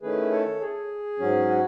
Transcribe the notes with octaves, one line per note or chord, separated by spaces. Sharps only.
D#3 A3 C#4 E4 G#4 B4
A4 C#5
G#4
G#2 F#3 C#4
F#4